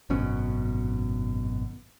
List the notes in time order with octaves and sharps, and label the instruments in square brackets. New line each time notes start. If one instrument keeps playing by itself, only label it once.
[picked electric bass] G#1 F#2 B2 C#4